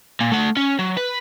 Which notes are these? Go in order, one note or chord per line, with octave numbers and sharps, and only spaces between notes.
A#2
A3 F#5
C#4
F#3
B4